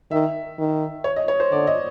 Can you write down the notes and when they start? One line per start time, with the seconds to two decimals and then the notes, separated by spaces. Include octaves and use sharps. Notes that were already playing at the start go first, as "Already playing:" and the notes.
0.11 D#3 E5
0.58 D#3
1.04 C#5
1.16 D#5
1.28 C#5
1.40 C5
1.51 D3 D5
1.67 D#5